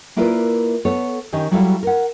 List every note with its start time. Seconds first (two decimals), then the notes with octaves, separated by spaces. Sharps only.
0.16 A#3 E4 F4 A#4 B4 D5
0.85 B3 A4 C#5
1.33 D#3 C#4 G4 D#5
1.51 F#3 G3 E4 F#4 A4 F5
1.83 A#4 F#5